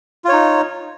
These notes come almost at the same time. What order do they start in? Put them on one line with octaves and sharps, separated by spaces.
F4 C#5 D#4